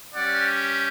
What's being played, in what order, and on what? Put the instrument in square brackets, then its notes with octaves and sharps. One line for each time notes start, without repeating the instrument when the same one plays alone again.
[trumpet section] G3 C#4 G4 D5 F#5